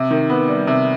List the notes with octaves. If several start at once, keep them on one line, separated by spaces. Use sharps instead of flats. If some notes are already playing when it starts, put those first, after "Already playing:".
Already playing: C3
D#3
B3
G3
C3